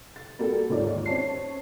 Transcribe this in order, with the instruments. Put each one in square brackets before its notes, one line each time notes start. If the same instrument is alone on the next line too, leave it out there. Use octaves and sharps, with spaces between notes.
[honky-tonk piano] A6
G3 A#3 F#4 G4 A4
D#2 G#2 F4 C#5 D5
C#4 C5 C#5 A5 C7